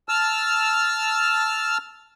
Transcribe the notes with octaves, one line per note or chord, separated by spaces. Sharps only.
A5 E6 F6